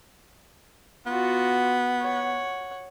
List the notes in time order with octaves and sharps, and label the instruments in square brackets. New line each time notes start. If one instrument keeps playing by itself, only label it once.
[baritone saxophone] B3 [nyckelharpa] F4 F#4
[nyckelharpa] C#5 F#5